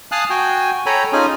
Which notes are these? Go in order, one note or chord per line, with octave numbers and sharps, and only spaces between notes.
F5 G#5 A5 D#6 F6 F#6
F#4 G5 G#5
A4 C#5 G5 G#5 A#5 B5
C#4 D#4 F4 G#4 G#5